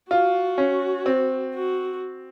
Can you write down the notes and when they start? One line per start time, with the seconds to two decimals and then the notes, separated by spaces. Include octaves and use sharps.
0.10 F4 F#4
0.58 C#4
1.06 C4
1.54 F#4